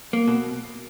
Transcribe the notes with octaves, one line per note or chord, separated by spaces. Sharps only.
A#3
B2